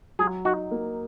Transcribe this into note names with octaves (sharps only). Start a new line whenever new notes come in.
F#3 G#4
D#4 F#4
A#3